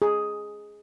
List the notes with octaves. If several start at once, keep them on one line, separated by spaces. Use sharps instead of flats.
G#4